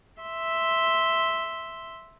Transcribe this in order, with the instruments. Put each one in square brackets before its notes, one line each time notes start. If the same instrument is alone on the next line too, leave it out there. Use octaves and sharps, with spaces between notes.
[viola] E5 C6